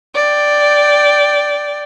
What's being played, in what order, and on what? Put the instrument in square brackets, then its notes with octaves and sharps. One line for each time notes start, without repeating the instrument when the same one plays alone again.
[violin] D5 G5